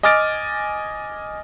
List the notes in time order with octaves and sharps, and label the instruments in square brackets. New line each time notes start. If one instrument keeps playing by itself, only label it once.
[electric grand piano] D#5 G#5 D6 F6 A6 D7